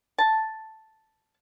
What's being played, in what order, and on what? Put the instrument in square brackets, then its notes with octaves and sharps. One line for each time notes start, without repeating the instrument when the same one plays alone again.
[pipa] A5